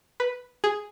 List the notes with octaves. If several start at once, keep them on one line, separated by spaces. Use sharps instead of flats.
B4
G#4